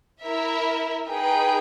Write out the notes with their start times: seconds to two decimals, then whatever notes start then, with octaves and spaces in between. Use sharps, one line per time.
0.23 E4 A#4 E5
1.09 D#4 G#4 B4 G5